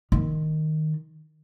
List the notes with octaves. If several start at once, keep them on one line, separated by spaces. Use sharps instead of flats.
D#3